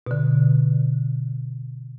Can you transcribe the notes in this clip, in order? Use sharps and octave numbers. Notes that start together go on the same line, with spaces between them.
B2 D3